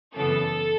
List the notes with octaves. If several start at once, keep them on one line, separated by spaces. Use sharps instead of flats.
F#2 C#3 E3 B3 A4